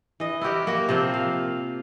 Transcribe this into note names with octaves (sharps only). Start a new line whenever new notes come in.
E3 D#5
E4 F#4 G4 A#4
A#3 F#4 A#4
C3 F3 A#3 C4
F5